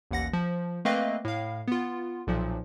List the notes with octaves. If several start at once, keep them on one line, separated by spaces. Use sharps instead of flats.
A1 D#2 F#5 A#6
F3
A3 A#3 C4 B4 D#5 F5
A2 F5
B3 F4
B1 A#2 F3